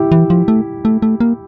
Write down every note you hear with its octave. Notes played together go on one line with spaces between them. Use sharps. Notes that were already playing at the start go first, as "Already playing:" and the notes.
Already playing: E4 G4
E3
F3
A3
A3
A3
A#3